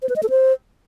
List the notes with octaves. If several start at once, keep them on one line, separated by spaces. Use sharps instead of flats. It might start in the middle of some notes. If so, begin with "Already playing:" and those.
C5
B4
D#5
A4
C5